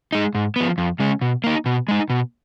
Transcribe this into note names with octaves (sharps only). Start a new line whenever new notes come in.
G#3 D#4
G#2
F3 B3
F2
C#3 G#3 C#4
B2
A#3 D#4
B2
G#3 D#4
B2